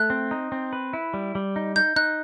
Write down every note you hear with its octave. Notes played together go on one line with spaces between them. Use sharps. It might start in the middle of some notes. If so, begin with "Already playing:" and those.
Already playing: A3 F#6
C4
D#4
C4
B4
E4
G3
G3
D#4
D#4 G6
D#4 F#6